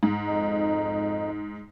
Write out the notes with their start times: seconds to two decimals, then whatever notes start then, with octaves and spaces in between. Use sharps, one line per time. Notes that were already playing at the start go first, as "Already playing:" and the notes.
0.03 G#2
0.27 F2 D#4